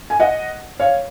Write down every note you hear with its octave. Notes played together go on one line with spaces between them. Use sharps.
G#5
D#5 F#5
C#5 F5